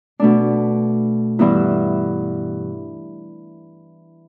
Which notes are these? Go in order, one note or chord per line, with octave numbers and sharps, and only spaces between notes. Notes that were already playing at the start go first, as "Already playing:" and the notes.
B2 A3 D4
G2 E3 B3 E4